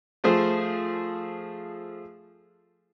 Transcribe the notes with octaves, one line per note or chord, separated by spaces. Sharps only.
F3 A3 G#4 C5